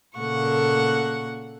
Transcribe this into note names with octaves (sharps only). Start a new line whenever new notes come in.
A#2 C#3 A#3 A4 F#5 C#6